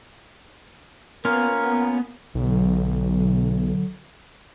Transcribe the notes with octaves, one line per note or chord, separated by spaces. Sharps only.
A#3 B3 C#4 F4 A#4 F6
B1 D3 F#3